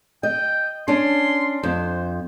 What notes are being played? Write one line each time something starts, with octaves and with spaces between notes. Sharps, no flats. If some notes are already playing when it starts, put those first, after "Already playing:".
D#5 G5
C#4 D4 C6
F2 C5